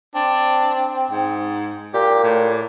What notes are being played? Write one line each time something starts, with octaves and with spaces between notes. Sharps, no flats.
C4 D4
G#2
A#2 G4
A2